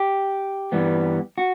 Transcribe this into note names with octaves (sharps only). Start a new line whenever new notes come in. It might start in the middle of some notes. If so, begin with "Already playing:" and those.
Already playing: G4
G2 E3 G3 B3
F#4